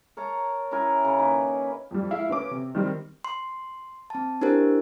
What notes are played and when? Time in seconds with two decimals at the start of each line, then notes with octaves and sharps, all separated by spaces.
0.17 A#4 C#5 A5 A#5
0.71 C#4 E4 A#4 G#5
1.05 C#3
1.18 D#3 A#3 B4
1.91 F2 G3
2.11 G#3 E4 F5
2.30 C#4 B4 D6
2.51 C3
2.75 D#3 G3 C4
3.25 C6
4.10 C4 A5
4.41 D4 E4 G4 A#4 C5